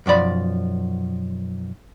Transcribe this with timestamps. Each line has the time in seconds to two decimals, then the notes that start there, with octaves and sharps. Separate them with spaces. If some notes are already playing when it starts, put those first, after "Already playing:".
0.06 B1 F#2 F3 D5 B5